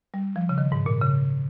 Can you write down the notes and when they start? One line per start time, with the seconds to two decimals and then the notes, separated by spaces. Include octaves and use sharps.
0.14 G3
0.36 F3
0.49 C#3
0.58 D#3
0.72 G#2
0.86 A#2
1.01 C#3